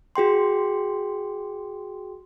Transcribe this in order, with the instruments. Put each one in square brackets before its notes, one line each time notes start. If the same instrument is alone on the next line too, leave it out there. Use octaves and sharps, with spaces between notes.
[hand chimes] F#4 G#4 G5 C6